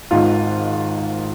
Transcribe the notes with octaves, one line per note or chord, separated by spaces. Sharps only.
G#1 G#2 D#3 F4